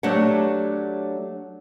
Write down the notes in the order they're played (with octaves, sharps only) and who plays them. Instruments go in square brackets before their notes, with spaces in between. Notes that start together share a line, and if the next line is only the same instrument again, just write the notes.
[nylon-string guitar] F#3 A3 D4 G4 C#5 F#5